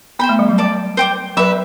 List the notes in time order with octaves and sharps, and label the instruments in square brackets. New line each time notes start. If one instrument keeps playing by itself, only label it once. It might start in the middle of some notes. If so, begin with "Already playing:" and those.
[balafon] B3 [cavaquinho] C5 G5 B5
[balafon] A3
G3
F#3
[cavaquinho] D5 A5 D6
C5 G5 D6
[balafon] F#3 [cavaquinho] B4 E5 B5